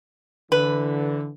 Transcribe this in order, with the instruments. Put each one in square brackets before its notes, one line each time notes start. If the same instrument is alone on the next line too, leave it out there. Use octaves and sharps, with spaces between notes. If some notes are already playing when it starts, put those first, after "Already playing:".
[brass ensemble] D3 E3 [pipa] B4